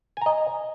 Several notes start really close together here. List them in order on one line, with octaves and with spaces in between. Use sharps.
G#5 A#5 D#5